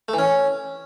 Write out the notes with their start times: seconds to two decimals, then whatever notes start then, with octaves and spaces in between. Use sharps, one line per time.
0.08 A3
0.14 E3
0.19 C#4